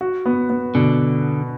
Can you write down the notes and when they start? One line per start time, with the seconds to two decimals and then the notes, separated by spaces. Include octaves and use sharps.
0.01 F#4
0.26 B3
0.50 B3
0.75 B2 D3